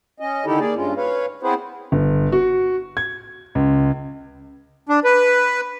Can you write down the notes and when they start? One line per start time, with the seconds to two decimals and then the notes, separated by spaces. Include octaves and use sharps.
0.20 C#4 D#5
0.46 D3 D#3 D#4 E4 G4 A4
0.60 A#3 G#4 D5
0.76 G2 G#3 C#4 F4
0.97 B4 C#5 F5
1.43 B3 C4 E4 G#4 B4 C5
1.92 G1
2.32 F#4
2.97 G#6
3.55 C#2
4.89 D4
5.04 B4